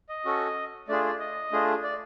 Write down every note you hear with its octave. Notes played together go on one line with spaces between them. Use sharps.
D#5
C#4 F#4 A4
A3 D4 F4 G#4 D5
D5
D#5
A3 D4 F4 G#4
D5